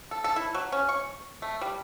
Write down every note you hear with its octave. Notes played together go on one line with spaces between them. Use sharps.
A4
A4
E4
F#3
C#4
C#6
A3
G3